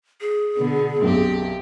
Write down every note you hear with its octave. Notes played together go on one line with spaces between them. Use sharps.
G#4
B2 D3 B3
B1 F#2 C4 G4